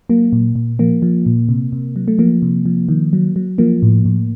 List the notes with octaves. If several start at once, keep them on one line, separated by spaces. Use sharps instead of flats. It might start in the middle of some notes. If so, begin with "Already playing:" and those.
F#3 A#3
A#2
A#2
F3 A#3
F3
A#2
C3
C3
F#3
A3
F3 A#3
C3
F3
D#3
F#3
F#3
F3 A#3
A2
A2